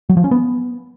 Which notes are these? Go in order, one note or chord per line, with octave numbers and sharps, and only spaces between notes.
F#3
F3
C#4
B3